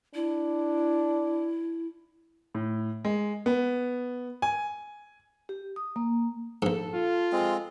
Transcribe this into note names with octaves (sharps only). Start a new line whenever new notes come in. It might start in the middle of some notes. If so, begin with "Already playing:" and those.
D4 E4
A2
G#3
B3
G#5
G4
D#6
A#3
A#1 G#2 A4
F4
G#3 C4